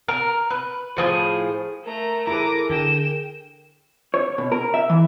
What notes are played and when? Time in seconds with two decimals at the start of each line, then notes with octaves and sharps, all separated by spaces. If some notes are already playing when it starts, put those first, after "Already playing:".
0.08 A#4
0.50 B4
0.97 A2 F3 G#4
1.85 A3 A#4 A#5
2.27 E4 G#4 A4 B4 A#5 D6 A#6
2.70 D3 G#4 G5 E7
4.14 C#5
4.38 B2
4.52 A#4
4.74 E5
4.89 E3